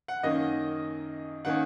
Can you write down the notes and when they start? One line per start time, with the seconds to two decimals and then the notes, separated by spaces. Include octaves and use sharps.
0.08 F#5
0.23 F#2 D#3 A#3 C#4 D#5
1.45 D#3 A#3 C#4 F#5